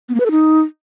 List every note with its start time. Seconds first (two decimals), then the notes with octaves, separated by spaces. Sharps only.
0.09 B3
0.14 A#3
0.20 B4
0.26 A4
0.31 D#4